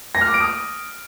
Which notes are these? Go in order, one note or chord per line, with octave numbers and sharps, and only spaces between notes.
A#6
F6
D6
D7
D#6